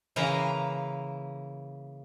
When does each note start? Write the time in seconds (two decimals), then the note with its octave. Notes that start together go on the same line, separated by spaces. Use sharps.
0.16 C#3 E3 A#3 A#5